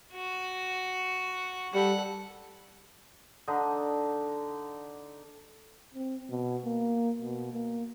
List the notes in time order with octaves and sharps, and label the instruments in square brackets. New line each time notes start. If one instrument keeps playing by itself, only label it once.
[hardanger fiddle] F#4
[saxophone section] G3 [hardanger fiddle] A4 F#5
[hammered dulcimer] D3 D#4
[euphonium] C4
B2
A#3
B2
A#3